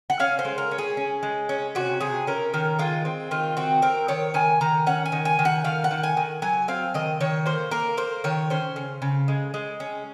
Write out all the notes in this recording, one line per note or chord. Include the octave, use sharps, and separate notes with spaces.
F#5
C#4 F5
C5
G#3
A#4
C#4
G#4
C#4
G#3
C#4
C3 F#4
C3 G#4
C#4 A#4
D#3 A#4
G#3 F4
C4
D#3 F4
C4 F#4
C4 A#4
D#3 C#5
D#3 G#5
D#3 A#5
C#4 F#5
G#5
D#3
G#5
D#3
F#5
D#3 F5
F#5
D#3
G#5
D#3
F#3 G#5
C4 F5
D#3 D#5
D#3 C#5
A#3 C5
A#3 A#4
A#3 C5
D#3 C#5
C#4 C5
C#3
C#3
G#3
G#3
C#4